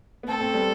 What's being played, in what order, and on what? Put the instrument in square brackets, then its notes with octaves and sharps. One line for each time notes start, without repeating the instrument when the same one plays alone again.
[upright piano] B3
[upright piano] A3 C4 [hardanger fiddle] A4
[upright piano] A3 C4
G3 B3